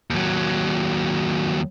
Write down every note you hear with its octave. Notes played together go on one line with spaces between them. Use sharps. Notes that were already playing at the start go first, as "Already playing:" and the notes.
D#2 F#3